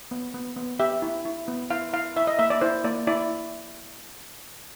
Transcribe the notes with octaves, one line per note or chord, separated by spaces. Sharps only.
B3
B3
B3
G4 E5
E4
E4
B3
E4 F5
E4 F5
E4 E5
D#5
A#3 E5
D5
E4 C5
A#3 D5
E4 D5